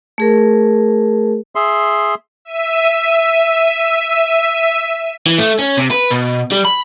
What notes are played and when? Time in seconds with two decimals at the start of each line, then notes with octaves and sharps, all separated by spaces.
0.18 A3 G#4 A#4
1.55 G#4 E5 C6
2.45 E5 D#7
5.26 E3
5.38 A3
5.59 C#4
5.77 C3
5.91 B4
6.11 B2
6.51 G3
6.65 B5